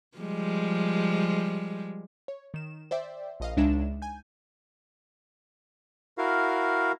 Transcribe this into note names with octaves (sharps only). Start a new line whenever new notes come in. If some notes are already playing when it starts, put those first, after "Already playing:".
F3 G3 G#3
C#5
D#3 E7
C5 D5 E5 G5
A#1 D#5 F5
C#2 G#3 D4 D#4 E5 E7
G#5 G6
E4 F#4 A#4 F5